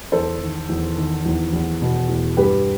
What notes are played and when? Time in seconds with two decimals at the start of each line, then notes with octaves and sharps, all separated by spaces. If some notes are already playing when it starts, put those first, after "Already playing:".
0.12 E2 A4 C5
0.41 D#3
0.69 E2
0.97 D#3
1.26 E2
1.53 E2
1.82 B2
2.09 E2
2.37 G2 G4 B4